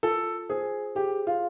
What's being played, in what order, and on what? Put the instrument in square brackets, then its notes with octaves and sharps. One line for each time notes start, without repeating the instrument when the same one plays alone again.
[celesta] F4 [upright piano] A4
[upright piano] G#4 [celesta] C5
[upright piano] G4 [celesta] G#4
[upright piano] F4